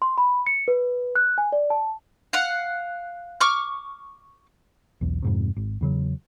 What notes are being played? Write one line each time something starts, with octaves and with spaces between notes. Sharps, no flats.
C6
B5
C#7
B4
F#6
G#5
D5
A5
F5 F#5
C#6 D6 F6
B1 E2
F2 G#2 C3
G#1
E2 C#3 F#3